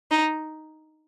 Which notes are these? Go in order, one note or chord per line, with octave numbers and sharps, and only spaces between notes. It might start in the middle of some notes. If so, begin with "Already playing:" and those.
D#4